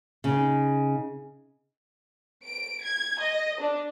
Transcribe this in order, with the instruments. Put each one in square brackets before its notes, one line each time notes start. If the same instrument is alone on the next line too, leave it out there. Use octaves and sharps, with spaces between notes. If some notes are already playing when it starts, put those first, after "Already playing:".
[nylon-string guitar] C#3 D#4
[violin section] D7
G#6
D#5
D4